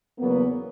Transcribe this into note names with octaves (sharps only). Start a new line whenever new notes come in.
E2 C#3 F#3 A#3 B3